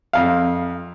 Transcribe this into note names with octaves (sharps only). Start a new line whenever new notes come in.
F2 F5